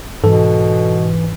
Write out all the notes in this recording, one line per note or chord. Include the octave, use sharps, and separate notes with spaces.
G#2 B2 E3 A4